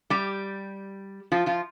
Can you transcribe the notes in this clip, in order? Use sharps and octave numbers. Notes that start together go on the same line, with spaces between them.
G3 G4
F3 F4
F3 F4